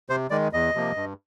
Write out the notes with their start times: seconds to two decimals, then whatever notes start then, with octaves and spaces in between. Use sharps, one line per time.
0.10 C3 C5
0.30 D#3 G#3 D5
0.53 E2 D#5
0.74 C3 F3 A#3
0.96 G2